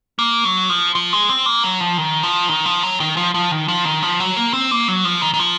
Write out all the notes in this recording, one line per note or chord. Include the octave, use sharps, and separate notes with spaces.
A#3
F#3
F3
F3
G#3
C4
A#3
F#3
F3
D#3
F3
D#3
F3
F#3
D#3
F3
F3
D#3
F3
D#3
F3
F#3
A#3
C4
A#3
F#3
F3
D#3
D#3
F3